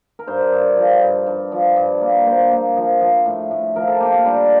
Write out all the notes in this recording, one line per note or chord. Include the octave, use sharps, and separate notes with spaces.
A#4
G2 C5
G2
F3
G2
G2
F3
G2
A#3
A#3 C5
A#3
F3
F3
A2
A2
F3 A#4
A4
A#3 G4
F4
G3 D4